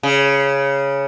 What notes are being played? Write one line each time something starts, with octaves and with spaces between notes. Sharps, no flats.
C#3